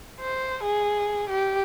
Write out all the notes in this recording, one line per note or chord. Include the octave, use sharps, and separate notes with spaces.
C5
G#4
G4